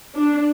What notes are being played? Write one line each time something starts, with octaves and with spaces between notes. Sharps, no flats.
D4